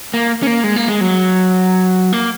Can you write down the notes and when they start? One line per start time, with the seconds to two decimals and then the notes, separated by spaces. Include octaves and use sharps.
0.14 A#3
0.43 C#4
0.47 A#3
0.64 G#3
0.76 A#3
0.88 G#3
1.01 F#3
2.13 A#3